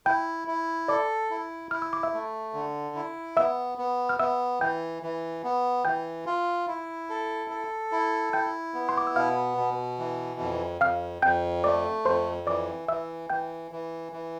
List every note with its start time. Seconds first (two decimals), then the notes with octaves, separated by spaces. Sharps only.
0.06 E4 G5 G6
0.48 E4
0.88 A4 D5 D6
1.30 E4
1.71 E4 F6
1.82 E6
1.93 D6
2.03 E5 E6
2.13 A3
2.54 D3
2.96 E4
3.37 B3 E5 E6
3.78 B3
4.09 F6
4.19 B3 E5 E6
4.61 E3 G5 G6
5.02 E3
5.44 B3
5.85 E3 G5 G6
6.26 F4
6.68 E4
7.10 A4
7.50 A4
7.92 E4
8.33 E4 G5 G6
8.74 B3
8.89 C6
8.97 D6
9.07 E6
9.16 B2 F5 F6
9.58 B2
9.99 E3
10.40 F2
10.81 F2 F5 F6
11.22 F2 G5 G6
11.64 A3 D5 D6
12.05 F2 C5 C6
12.47 E3 D5 D6
12.88 E3 E5 E6
13.30 E3 G5 G6
13.71 E3
14.12 E3